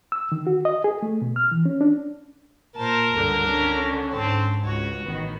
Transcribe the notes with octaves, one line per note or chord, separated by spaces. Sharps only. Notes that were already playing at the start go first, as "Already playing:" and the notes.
E6
D#3
F#4
D#5
G#4
A3
B2
F6
E3
C#4
D4
A#2 A#4 C5 A5
C#2 G2 D3 D4
D3 C#4
G#2 C4 A5
C#2 F#4 C#5
A1 D#3 B3